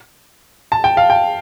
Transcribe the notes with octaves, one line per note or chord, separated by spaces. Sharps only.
A5
G5
F5
G5